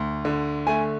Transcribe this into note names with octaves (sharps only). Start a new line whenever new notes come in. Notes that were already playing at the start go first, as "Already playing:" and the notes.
Already playing: D2
D3
A3 G#5